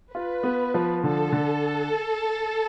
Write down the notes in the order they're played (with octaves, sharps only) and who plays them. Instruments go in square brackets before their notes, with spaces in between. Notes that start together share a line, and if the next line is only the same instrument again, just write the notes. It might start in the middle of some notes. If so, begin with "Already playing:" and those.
[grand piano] F4 [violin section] B4
[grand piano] B3
F3
[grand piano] D3 [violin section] A4
[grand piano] D3